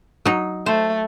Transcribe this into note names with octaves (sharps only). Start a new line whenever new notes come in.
F#3 D#4
A3 C5